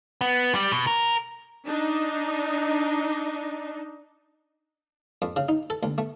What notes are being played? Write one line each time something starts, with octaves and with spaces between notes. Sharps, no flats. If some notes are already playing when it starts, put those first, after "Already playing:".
B3
G3
B2
A#4
D4 D#4
F2
C#3
D#4
A4
D2
A3